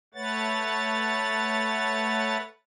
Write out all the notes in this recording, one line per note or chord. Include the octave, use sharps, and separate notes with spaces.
A3 B4 C#5 F#5 A6